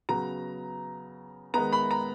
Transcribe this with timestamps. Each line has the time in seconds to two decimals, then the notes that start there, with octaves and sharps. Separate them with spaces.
0.09 C#3 F#3 B3 A#5
1.54 D#3 G#3 B3 A#5
1.72 B5
1.91 A#5